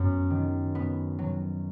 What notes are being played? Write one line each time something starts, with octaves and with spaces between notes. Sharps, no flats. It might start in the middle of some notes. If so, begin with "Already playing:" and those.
Already playing: F#2 F#3 B3
D#3
B3
F#3